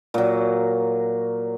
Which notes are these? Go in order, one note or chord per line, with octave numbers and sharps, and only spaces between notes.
A#2 F#3